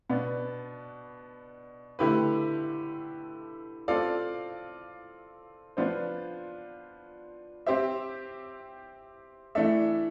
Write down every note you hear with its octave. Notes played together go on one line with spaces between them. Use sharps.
B2 B3 D4
D3 A3 E4 G4 B4
C4 F4 A4 D5 F5
F3 B3 D4 F4 C5
C4 G4 C5 E5
E3 A3 D4 A4 E5